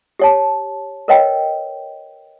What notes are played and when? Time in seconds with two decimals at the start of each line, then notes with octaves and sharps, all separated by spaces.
0.19 G4 C#5 A5
1.08 A#4 B4 C#5 D#5 G5